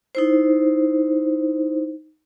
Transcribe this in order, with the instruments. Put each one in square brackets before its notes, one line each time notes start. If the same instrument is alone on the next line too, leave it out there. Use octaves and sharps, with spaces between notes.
[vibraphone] D#4 E4 C5